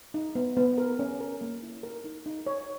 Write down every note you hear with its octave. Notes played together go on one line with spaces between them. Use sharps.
D#4
B3
B3
A#4
C#4
A#4
A#3
E4
A#4
D#4
D#4
C#5